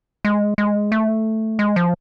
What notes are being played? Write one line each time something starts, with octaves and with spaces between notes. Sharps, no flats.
G#3
G#3
A3
G#3
F3